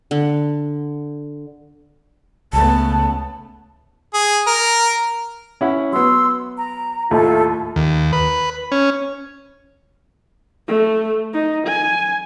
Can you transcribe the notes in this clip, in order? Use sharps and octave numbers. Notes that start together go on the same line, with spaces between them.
D3
C#2 C#3 A3 B3 A5
G#4
A#4
C#4 E4 F#5
F#3 B3 C6 E6
A#5
D#2 A2 F4 A4 E5
D#2
B4
C#4
A3
D#4
G#5